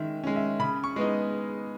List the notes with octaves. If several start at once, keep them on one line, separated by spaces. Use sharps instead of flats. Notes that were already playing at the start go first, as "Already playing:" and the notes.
Already playing: D#3 G#3 C#4 E5
G#3 C#4
E5
C#3 B5
C#6
G#3 B3 D#4